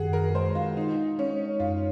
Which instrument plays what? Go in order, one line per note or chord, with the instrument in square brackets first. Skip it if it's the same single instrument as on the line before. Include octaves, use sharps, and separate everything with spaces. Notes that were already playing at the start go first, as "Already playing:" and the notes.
Already playing: [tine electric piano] F#2 D#3 [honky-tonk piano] F#4 G#4
[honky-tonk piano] A#4
[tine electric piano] G#3 [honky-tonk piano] C5
[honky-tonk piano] F4
[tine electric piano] G#3 [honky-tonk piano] D#4
[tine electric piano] G#3 [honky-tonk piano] C#4
[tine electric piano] F#2 [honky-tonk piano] F4